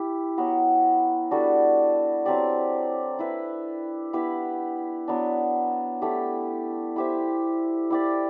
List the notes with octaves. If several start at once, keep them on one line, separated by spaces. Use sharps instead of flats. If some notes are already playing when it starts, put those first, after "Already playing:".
Already playing: E4 G4
F#3 B3 F#4
G3 D4 F#4 A4
F#3 C4 G4 D5
E4 B4 E5
B3 E4 G4 B4
F#3 B3 D4
A3 E4 G4
E4 G4 C5 E5
E4 G4 D5